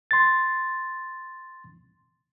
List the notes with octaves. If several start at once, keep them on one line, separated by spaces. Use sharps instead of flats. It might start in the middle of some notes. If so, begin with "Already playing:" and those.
C6 A6